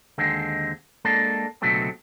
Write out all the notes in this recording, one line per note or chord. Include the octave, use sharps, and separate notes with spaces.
D#2 D3 G#3 C4
G#3 A#3 D4 A4
C#2 B2 D3 F#3 A3 C4